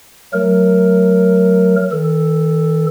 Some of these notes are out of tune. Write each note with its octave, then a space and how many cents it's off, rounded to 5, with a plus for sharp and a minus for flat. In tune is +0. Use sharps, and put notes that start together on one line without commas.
F#3 +0 A3 +0 A#4 +0
D#3 +45 A4 +0